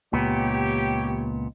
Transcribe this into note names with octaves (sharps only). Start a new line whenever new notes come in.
C#2 A#2 B3 G4 C#5